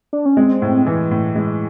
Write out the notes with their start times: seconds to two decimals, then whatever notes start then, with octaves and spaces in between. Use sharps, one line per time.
0.13 D4
0.26 C#4
0.37 G#3 C4
0.62 A2
0.86 E3
1.11 A2
1.36 G#3